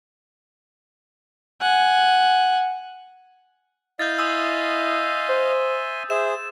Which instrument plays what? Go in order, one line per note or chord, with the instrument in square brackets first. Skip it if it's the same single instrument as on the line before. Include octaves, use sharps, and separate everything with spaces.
[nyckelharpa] F#5 G#5
[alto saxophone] E4 [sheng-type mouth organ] D#5 F5 [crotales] G6 A6
[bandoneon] E5 G#5 C6 [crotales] D#6 E6
[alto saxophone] C5
[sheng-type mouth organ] G#4 C5 [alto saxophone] E5 [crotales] E7